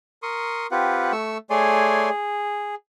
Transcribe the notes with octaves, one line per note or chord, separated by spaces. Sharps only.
A#4 C6 C#6 D#6
C4 F4 G4 B4 F#5
A3 C#6 E6
A3 G#4 C#5 D5 G#5 C6
G#4